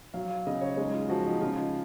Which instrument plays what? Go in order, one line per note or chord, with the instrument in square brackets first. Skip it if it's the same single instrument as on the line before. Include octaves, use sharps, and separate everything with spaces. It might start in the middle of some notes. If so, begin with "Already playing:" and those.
[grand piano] F#3 F5
F5
C#3 D#5
C#5
G#3 D#4
F4
F3 F#4
D#4
C#3 F4